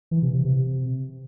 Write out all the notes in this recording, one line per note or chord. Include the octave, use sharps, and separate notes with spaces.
E3
C3
C3
C3